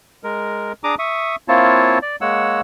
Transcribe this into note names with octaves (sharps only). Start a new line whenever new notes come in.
G#3 A#4
D4 G#4 A#5 D6 D#6
E5 C#6 D#6
A#3 C4 E4 F4 C#5 A5
D5
G#3 A#3 C#5 F#5 E6